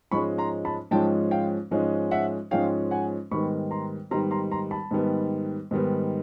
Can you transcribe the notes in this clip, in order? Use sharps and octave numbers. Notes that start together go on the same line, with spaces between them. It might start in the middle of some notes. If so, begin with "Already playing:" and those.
G#2 F3 G#3 C#4 B5 C#6
A#5 C6
A5 B5
G#2 F3 G#3 C#4 G5 A5
F5 G5
G#2 F3 G#3 C#4
E5 F#5
G#2 F3 G#3 C#4 F5 G5
F#5 G#5
G#2 D#3 G3 B3 B5 C#6
A#5 C6
G#2 D#3 G3 B3 A#5 C6
A#5 C6
A#5 C6
A5 B5
G#2 D#3 G3 B3
G#2 D#3 G3 B3